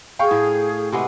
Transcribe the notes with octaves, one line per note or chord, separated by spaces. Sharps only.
G#4 F5 G5 C#6
A2
C3 G#3 B3